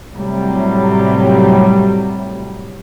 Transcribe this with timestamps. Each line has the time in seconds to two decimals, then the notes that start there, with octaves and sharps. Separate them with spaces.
0.15 A2 C3 F#3 G3